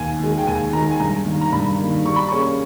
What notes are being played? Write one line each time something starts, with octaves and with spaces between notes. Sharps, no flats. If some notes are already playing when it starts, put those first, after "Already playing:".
Already playing: D#2 G#5
D#3 G#3
G5
D#2 G#5
D#3 G#3 A#5
G#5
G2 A#5
D#3 A#3
A#5
G2 B5
D#3 A#3
G3 C#6
B5
A#3 C#4 G#4 C#6